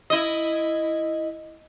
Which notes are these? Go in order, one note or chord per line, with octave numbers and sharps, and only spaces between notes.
E4 D#5